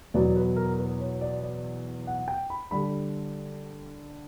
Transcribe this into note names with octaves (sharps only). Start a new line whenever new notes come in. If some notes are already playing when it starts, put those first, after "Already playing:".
E2 B2 F#3 B3 D5
B4
A#4
B4
C#5
D5
D5
F#5
G5
B5
D3 G3 B5